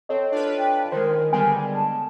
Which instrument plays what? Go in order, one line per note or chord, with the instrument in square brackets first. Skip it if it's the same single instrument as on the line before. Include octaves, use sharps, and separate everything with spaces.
[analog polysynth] C4 [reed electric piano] A4 C#5 D#5
[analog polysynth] D4 F4 B4
[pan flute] G5
[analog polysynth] D#3 G#3 [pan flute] A#4 [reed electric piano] C5
[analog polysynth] D3 G3 G#3 [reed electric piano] B3 [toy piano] G#5
[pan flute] A5